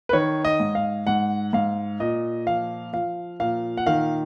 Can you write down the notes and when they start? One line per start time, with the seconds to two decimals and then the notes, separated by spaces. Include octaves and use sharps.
0.09 B4
0.13 D#3 C#5
0.45 D#5
0.60 G#2
0.75 F5
1.07 G#2 F#5
1.53 G#2 F5
2.00 A#2 D#5
2.46 F3 F5
2.93 F3 F5
3.40 A#2 F5
3.77 F#5
3.86 D#3 F5